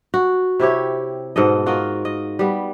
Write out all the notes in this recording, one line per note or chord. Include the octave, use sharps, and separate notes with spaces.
F#4
C3 E4 G4 C#5
G#2 B2 A4 D#5
F4 F#4 A#4 D#5
D#5
G3 B3